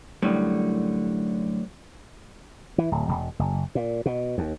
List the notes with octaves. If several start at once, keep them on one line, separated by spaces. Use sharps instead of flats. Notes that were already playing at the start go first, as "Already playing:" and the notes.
C2 F#2 A2 D3 G3
E3
D1
E1
F#1
A#2
B2
D#2